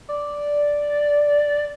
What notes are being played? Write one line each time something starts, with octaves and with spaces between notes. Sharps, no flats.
D5